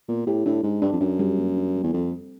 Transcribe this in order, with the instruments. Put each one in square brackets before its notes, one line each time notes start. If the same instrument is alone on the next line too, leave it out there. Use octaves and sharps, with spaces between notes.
[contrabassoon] A#2 [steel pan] B3
[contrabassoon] A2 [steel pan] G4
[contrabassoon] A2 [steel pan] D4
[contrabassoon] G#2 [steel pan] D4
[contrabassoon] G2 [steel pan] D4
[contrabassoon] F2
[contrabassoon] F#2 [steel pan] D4
[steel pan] G3
A#3
D4
G3
[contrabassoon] E2
[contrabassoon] F2 [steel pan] A4
[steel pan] C4